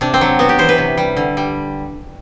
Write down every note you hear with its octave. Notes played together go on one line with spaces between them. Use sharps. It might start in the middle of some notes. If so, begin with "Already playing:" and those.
C3 D4
C4
F#3
B3 F#4
G4
E3 C5
B4
C3
G3
D3
G3